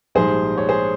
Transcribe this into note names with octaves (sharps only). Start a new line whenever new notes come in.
A#1 G#2 G3 G#4 C5
C#5
G#4 C5